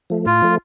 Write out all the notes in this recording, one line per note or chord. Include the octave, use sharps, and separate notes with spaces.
F3 A3
A2 F4
F3 A3